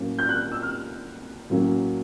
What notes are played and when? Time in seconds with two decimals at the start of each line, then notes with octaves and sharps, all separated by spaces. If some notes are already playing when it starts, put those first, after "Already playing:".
Already playing: A2 F#3 A#3 C#4
0.19 G6
0.29 F#6
0.52 E6
0.62 F6
1.50 A2 F#3 A#3 C#4